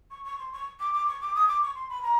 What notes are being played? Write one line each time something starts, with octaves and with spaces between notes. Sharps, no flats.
C#6
C#6
C6
C#6
D6
D6
C#6
D6
D#6
D6
C#6
C6
B5
A#5